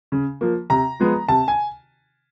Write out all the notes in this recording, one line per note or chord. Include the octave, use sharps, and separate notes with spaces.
C#3
F3 A#3
C3 A#5
F3 G#3 B3
C3 A5
G#5